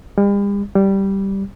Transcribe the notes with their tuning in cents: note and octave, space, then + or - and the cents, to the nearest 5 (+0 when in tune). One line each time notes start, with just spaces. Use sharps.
G3 +45
G3 -5